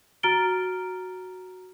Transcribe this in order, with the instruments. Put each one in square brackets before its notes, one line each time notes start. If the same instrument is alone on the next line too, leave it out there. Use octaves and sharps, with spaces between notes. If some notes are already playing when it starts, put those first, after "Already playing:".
[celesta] F#4 A#5 F6 A6 D7 G7